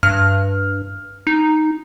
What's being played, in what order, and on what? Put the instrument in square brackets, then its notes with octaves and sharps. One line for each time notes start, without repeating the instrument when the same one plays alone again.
[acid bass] G2 [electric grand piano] F6
[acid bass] D#4